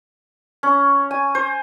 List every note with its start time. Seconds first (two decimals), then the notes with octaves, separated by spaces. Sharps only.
0.63 C#4
1.11 G#5
1.35 C5